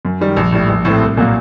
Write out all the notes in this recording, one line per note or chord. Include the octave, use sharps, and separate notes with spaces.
F#2
D#3 G3
A#1
A2 G3
A#1
A2 A3 C4
C2
A#2 F#3 A#3